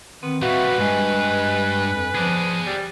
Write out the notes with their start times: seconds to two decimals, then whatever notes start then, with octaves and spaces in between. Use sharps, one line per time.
0.23 D#3 B3 C4
0.42 A#2 G3 F#4 B4 E5 F5 C#6
0.80 G2 G#3 G#5
1.93 F2
2.15 F3 G#4 D5
2.66 G3